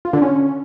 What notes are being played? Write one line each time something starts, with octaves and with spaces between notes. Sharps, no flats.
F4
D3
C#4